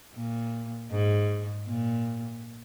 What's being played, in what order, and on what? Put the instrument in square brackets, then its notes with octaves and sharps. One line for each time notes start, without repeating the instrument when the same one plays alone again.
[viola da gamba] A#2
G#2
A#2